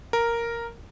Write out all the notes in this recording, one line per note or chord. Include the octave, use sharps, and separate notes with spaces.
A#4